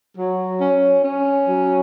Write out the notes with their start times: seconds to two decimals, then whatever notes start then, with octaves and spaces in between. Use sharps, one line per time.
0.17 F#3
0.60 C#4
1.04 C#4
1.47 F#3